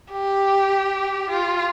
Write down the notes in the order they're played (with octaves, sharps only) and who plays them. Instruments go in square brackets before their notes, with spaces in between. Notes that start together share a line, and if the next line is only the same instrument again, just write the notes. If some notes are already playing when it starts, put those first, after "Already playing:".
[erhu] G4
F4